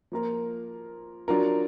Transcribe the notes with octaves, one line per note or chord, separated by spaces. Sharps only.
F3 A#3 F4 A#4
F#3 D4 F4 A#4